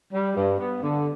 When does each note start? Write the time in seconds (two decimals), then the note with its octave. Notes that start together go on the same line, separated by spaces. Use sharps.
0.13 G3
0.36 G2
0.59 B3
0.83 D3